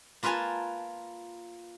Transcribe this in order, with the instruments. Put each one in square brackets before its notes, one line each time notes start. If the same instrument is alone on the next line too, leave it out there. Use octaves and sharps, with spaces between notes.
[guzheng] A#3 F4 B4 F5 G#5 A5